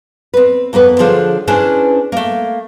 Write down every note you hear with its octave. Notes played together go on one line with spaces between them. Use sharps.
C4 B4
F2 A#3 B3 B4
D3 F3 D4 G#4 C5 C#5
C#4 D4 E4 G#4 B4 C5
A3 A#3